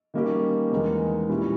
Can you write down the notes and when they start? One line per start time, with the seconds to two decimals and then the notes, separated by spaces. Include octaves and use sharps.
0.14 D#3 G3 A#3 C#4 G4
0.72 E2 D#3 G#3 D#4 A#4
1.29 A#2 G3 C#4 E4